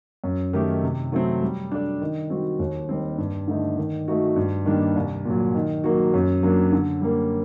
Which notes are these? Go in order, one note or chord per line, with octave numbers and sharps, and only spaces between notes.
F#2
D#3 A3 D#4 G4
C3
F#3 A3 C4
G3
D4 A4 D5
D#3
G3 C4 F#4
D#2
D#3 G3 C4
G2
D3 A3 D#4
D#3
A3 D#4 F#4
G2
D#3 G3 A#3 D4
C2
A#2 F#3
D#3
F#3 A#3 F#4
F#2
F#3 A#3 D4
D3
G3 A#3